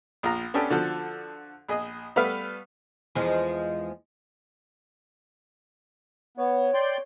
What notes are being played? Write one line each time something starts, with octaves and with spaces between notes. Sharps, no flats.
A#1 F4 A#5
B3 C#4 D4 G4 A4
D3 F3 F#4 A4
A#1 G#4 D#5
G3 A3 B3 B4 E5 F5
E2 F3 G#3
B3 C#5
D5 G5 C6